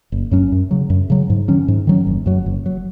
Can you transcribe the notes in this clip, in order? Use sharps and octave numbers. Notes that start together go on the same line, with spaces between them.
F#1
F#2 F#3 C#4
F#2
C#3 F#3
F#2
C#3 F#3
G#2
D#3 F#3 C#4
G#2
D#3 F#3 C#4
F#1
F#2 F#3
F#1
F#3